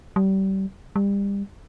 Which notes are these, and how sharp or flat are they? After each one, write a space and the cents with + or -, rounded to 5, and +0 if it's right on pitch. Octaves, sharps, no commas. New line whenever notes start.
G3 -30
G3 +30